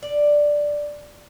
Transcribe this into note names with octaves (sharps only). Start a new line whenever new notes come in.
D5